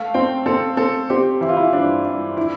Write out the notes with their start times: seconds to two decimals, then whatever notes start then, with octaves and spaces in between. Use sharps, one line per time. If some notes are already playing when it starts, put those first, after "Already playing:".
Already playing: A3 F5
0.14 C4 G5
0.46 C4 A4
0.77 C4 A4
1.10 C4 G4
1.41 E3 E4
1.49 F4
1.57 E4
1.73 G2 D4
2.05 G2
2.37 E4